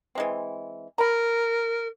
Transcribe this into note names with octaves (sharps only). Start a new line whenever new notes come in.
E3 G#3 C4
A#4 A#5 B5